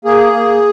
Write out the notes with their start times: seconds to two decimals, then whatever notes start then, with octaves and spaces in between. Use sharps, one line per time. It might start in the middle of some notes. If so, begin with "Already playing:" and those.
0.05 A#3 G#4
0.33 A#3